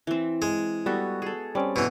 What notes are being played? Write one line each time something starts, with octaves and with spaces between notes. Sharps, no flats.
E3 C4
G#3
G3 B3 F#4 A4
G#4 A4
G3 C4 C#4 D5
B2 E3